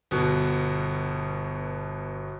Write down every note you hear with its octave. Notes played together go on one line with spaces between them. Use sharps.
G1 B2